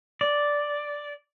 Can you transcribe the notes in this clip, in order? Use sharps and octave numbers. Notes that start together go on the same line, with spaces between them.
D5